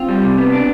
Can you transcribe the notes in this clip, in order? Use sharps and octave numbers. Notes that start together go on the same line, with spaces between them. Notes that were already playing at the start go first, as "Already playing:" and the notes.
Already playing: C4 F4
G3
C3
B3
D4